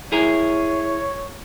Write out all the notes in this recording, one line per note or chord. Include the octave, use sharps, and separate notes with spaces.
E4 G#4 A#4 C#5